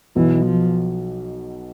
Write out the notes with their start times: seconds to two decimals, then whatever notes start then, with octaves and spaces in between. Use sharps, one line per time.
0.16 B1 B2 E3
0.45 F3